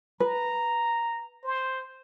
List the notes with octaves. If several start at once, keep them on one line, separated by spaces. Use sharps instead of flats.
B4 A#5
C5